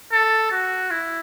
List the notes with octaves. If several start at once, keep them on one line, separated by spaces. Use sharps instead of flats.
A4
F#4
E4